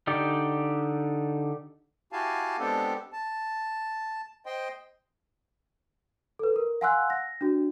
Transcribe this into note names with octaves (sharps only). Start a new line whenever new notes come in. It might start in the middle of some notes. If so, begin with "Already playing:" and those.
D3 D#4 G4 D5
E4 F#4 G4 F5 G#5 A5
G#3 B3 C4 D4 G4 A4
A5
C5 D#5 G5 C6
A4 B4
A#4
F5 F#5 G#5 C6 E6 F#6
A#6
D4 F#4